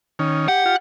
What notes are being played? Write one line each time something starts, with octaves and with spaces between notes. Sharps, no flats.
D#3 C#4
G4 F#5
F4 G4